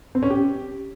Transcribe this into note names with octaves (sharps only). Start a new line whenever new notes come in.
C4
C#4
G4